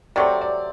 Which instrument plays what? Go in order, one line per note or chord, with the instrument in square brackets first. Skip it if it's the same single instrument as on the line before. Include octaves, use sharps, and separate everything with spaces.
[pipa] C3 F#3 A3 C4 [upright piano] D5
[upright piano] D5